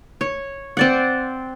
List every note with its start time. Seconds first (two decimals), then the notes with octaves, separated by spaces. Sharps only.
0.21 C#5
0.77 C4 D5 F#5